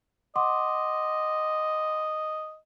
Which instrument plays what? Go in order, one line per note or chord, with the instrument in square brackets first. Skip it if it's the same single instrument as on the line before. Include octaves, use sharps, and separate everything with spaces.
[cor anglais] D#5 [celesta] F#5 C6 D6